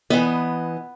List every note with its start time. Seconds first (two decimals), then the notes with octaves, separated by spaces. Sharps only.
0.10 E3 B3 D#5